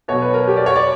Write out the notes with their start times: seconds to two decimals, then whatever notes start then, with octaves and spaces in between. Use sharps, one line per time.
0.08 B2 F#3 C#5
0.22 B4
0.34 A#4
0.48 G4
0.57 D5
0.66 C#5
0.76 D5